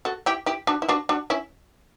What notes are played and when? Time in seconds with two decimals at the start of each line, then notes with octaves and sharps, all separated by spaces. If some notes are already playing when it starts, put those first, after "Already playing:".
0.05 F#4 A4
0.26 E4 G4
0.46 E4 G4
0.67 D4 F#4
0.82 E4
0.89 D4 F#4
1.09 D4 F#4
1.30 C#4 E4